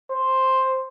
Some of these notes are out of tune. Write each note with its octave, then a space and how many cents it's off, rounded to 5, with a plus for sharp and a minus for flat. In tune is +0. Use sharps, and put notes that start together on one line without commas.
C5 +5